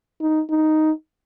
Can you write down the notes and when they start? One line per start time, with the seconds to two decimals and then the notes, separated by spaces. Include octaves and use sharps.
0.21 D#4
0.50 D#4